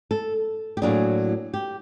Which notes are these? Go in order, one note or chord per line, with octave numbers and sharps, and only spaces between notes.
A4
G4
A2 F#3 A#3 D4 G#4
G4